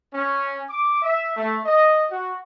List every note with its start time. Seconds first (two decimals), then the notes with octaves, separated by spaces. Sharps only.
0.14 C#4
0.70 D6
1.02 E5
1.37 A3
1.65 D#5
2.11 F#4